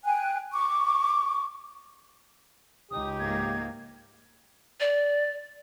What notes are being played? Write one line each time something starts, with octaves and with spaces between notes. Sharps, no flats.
G5 G#5 F#6
C#6 D6
C#2 D#4 G4 D#6
G#2 A#3 G#6
D5